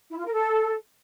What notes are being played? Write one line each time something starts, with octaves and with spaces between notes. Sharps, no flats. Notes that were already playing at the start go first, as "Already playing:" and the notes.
E4
F4
A#4
A4